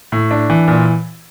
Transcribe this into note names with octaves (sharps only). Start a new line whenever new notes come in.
A2
D4
E3
A#2